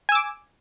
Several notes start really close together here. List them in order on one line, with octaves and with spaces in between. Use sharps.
G#5 E6 D6